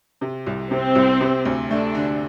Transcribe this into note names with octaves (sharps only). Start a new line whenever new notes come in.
C3
C2
C3 C4
C2
C3
D2
A3 D4
D3